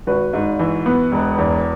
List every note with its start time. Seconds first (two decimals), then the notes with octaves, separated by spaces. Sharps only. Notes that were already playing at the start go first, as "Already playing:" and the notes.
0.07 G#1 F#4 B4
0.33 G#2
0.59 E3
0.86 B3
1.12 E1
1.38 E2